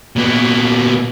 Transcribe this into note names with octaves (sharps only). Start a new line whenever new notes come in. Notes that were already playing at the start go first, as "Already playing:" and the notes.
A#2 B3